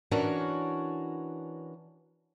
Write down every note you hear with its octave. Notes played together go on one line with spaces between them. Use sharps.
E3 C#4 D4 F#4 A#4 C#5